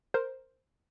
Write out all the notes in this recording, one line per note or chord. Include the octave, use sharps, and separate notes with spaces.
A#4 C5